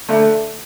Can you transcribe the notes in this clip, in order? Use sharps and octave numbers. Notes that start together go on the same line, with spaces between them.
D3 A3